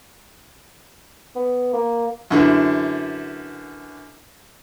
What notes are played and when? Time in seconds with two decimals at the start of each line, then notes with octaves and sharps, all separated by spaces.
1.35 B3
1.73 A#3
2.31 F#2 D3 E3